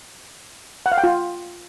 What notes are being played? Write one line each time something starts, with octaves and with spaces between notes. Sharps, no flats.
F#5
F5
G5
F4